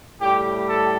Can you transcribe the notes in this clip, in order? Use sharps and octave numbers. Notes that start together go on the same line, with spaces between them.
A2 G3 G4
A4